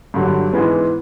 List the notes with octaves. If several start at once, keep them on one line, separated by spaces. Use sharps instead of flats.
G2 D3 F#3
G#2 E3 G#3 B3